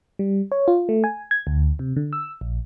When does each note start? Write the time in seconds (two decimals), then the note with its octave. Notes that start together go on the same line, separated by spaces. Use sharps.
0.19 G3
0.52 C#5
0.68 F4
0.89 A3
1.04 G#5
1.31 G#6
1.47 D2
1.79 C3
1.96 D3
2.13 E6
2.41 A#1